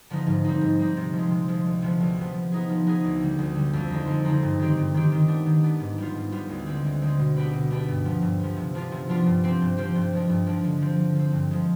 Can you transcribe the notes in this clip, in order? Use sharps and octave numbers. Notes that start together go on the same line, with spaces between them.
D3 F3 B3 D#4
G#2
G3 C4 D#4
G#2
G3 C4 D#4
C3
F3
G#3
C3
F3 G#3
D2
C3 F3 B3
D2
C3 F3 B3
F3
B3 D#4 G#4
F3
B3 D#4 G#4
D2
D3 G3
D2
D3 G3
F2
D3 G#3 C4 D#4
F2
D3 G#3 C4 D#4
G2
D#3 G#3 C4 G4
G2
D#3 G#3 C4 G4
D#3
B3 D4
D#3
B3 D4
G#2
G3 B3 F4
G#2
G3 B3 F4
D2
D3 G#3 C4
D2
D3 G#3 C4
B2
B3 D4 G4 B4
B2
B3 D4 G4 B4
G2
F3 B3
G2
F3 B3
C3
F3 B3 D4 F4
C3
F3 B3 D4 F4
G2
F3 C4 G4 C5
G2
F3 C4 G4 C5
G2
F3 G#3 D4
G2
F3 G#3 D4
D3
F3 C4
D3
F3 C4
G2
F3 G#3